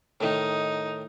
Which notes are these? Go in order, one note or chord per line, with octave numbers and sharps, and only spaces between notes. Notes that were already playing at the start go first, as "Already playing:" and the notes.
A2 D#3 D#4